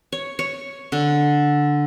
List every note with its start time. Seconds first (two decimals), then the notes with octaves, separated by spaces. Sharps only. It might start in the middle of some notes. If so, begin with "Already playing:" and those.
0.12 C#5
0.39 C#5
0.92 D3